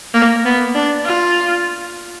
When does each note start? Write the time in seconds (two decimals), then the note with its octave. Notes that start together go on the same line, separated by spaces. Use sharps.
0.14 A#3
0.45 B3
0.75 D4
1.05 F4